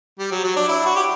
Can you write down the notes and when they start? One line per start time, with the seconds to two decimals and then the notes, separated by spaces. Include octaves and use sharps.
0.19 G3
0.32 F#3
0.44 F#3
0.56 D4
0.68 E4
0.86 F#4
0.96 G4